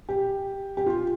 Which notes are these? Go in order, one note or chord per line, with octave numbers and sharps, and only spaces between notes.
G4
G4
F4